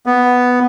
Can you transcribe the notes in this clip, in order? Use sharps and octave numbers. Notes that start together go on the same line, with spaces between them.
B3